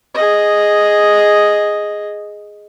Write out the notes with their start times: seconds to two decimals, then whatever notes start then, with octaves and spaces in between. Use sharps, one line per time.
0.14 G#4 D#5